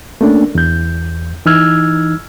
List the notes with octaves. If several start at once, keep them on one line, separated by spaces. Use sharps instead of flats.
A3 A#3 C#4 D4
E2 G6
E3 D#4 E6 F6 G#6